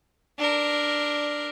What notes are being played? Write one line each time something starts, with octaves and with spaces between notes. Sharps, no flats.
D4 A#4